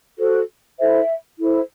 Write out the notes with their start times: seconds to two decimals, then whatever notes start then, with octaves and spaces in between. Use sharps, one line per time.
0.18 F#4 A4 C5
0.79 E4 A4 C5 E5
1.39 E4 A4 C5